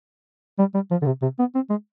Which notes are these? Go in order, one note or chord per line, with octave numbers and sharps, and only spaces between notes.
G3
G3
F3
D3
C3
C3
B3
C4
G#3